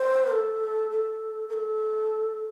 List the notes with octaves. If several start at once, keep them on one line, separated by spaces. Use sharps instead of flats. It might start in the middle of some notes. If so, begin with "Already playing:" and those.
Already playing: C5
A4
A4
A#4
A4